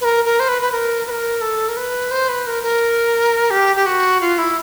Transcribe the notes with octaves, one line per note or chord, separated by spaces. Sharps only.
B4
A#4
A#4
C5
B4
B4
A#4
B4
A#4
A4
A#4
B4
C5
B4
A#4
A#4
G4
G4
F#4
F4
E4